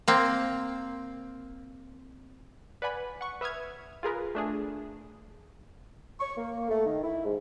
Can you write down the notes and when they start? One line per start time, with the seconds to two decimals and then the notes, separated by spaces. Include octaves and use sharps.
0.08 A#3 C4
2.82 B4 D5 F#5 G#5 B5
3.21 F#5 C#6
3.41 B4 E5 D#6 F6 G#6
4.03 F4 G#4 A#4 B4
4.35 A3 D4 G#4
6.20 C#6
6.37 A#3
6.70 A3
6.86 D#3
7.04 E4
7.25 G#2